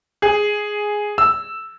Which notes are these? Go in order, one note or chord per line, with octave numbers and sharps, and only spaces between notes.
G#4
E6